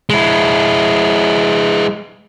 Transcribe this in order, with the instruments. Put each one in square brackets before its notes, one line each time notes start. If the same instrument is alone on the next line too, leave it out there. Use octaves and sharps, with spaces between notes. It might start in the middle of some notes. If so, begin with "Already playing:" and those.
[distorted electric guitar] G#3 E4